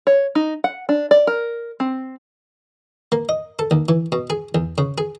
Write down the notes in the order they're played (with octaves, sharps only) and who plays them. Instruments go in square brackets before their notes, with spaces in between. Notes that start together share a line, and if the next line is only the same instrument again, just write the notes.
[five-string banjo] C#5
D#4
F#5
D4
D5
A#4
C4
[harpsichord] A#3
D#5
A4
D#2
E3
B2
G#4
E2
C#3
G#4